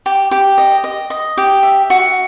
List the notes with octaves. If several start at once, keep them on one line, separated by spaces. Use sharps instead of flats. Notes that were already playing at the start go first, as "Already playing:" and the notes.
G4
G4
D#5
D#5
D#5
G4
E5
F#4